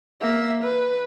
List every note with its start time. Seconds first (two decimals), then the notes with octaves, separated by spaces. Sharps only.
0.22 A#3 E5
0.63 B4